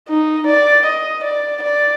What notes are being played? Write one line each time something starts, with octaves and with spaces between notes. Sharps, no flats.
D#4
D5
D#5
D5
D5